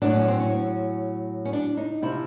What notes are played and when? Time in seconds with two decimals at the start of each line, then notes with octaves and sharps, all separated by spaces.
0.02 A2 F#3 D4
0.15 C#4
0.28 C4
0.40 C#4
1.45 C#4
1.53 D4
1.77 D#4
2.02 C3 F3 E4